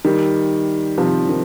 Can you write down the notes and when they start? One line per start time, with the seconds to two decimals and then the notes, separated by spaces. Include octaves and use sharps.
0.04 D#3 G3
0.98 C3 F3
1.29 D#3